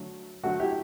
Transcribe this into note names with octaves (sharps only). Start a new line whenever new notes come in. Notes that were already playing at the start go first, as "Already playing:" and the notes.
Already playing: D3 F#3 A3
D3 F#3 A3 F#4
E4 G4